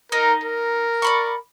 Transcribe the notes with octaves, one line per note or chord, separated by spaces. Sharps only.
D#4 A#4
A#4
D5 B5 C#6